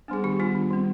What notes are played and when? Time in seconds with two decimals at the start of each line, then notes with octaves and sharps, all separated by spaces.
0.08 G3 B3 D4 G#4
0.24 D#3 G4
0.39 G3 B3 D4 F4
0.55 D#3
0.70 G3 C4